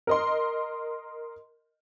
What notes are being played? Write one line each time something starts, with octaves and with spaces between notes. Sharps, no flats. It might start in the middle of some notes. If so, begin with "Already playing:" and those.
A#4 D#5 C6